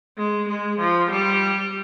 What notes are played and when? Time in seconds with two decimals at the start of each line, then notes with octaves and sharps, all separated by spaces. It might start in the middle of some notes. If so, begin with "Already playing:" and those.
0.18 G#3
0.49 G#3
0.79 F3
1.11 G3